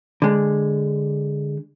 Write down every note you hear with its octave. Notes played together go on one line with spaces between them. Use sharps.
D3 G#3